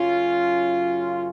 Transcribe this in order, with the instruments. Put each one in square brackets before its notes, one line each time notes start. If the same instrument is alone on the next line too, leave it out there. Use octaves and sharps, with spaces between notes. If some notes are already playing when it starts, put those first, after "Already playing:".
Already playing: [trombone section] F#2 C#3 F#3 C#4 F4